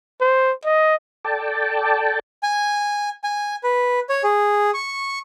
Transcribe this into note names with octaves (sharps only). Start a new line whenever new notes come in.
C5
D#5
A4 D5 G5 A5
G#5
G#5
B4
C#5
G#4
C#6